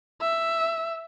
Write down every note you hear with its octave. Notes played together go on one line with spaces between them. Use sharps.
E5